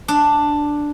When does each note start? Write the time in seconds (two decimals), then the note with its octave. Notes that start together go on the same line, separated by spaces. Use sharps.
0.08 D4